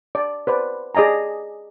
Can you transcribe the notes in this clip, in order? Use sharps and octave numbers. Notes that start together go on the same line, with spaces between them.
D5
B4 C5 D5
G#4 D5 D#5 G#5 A#5